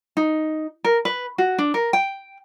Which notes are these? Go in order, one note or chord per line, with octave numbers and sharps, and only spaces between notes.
D#4
A#4
B4
F#4
D4
A#4
G5